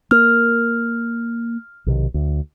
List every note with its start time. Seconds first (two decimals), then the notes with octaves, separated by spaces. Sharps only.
0.11 A#3 F6
1.86 B1 C3 D#3
2.14 D2